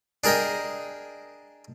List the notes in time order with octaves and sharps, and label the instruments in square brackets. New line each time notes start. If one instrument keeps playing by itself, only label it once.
[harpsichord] D4 G#4 A#4 D#5 G5